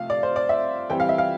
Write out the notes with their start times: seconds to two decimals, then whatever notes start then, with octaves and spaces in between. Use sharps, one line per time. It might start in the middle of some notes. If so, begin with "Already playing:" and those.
Already playing: C3 F3 A3 F5
0.10 D5
0.23 C5
0.36 D5
0.49 E5
0.90 E3 G3 C4 G5
1.00 F5
1.09 E5
1.18 F5